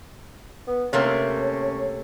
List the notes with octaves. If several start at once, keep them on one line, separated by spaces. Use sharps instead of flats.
B3
C3 A3 A#3 C#4